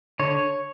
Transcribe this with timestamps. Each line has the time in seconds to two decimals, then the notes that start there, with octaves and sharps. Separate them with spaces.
0.19 D3 C#5